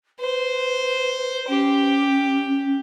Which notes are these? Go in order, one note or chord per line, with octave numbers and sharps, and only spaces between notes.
B4 C5
C#4 G4